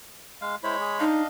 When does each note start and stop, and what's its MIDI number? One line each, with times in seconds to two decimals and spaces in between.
0.41 0.56 56
0.41 0.56 77
0.63 1.05 56
0.63 0.76 64
0.63 0.76 72
0.63 1.05 73
0.63 1.05 83
0.81 0.97 68
1.00 1.27 62
1.00 1.21 63
1.00 1.27 75
1.00 1.27 77